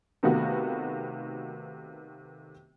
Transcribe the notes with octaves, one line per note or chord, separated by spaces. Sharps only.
C3 D#3 A3 B3 F4 F#4